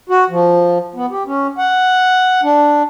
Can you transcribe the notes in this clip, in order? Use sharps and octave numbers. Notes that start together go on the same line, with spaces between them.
F#4
F3
B3
G4
C#4
F#5
D4